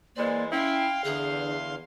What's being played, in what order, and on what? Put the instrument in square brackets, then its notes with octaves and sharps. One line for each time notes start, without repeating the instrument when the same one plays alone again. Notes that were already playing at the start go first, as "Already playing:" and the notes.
[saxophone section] E3 G#3 C5 [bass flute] A#3 [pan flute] D5
[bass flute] C#4 [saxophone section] E4 [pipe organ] F5 C6 [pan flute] G5
[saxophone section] E2 [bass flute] D3 [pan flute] G#4